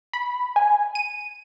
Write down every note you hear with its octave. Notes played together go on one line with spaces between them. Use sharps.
B5
G#5
D#7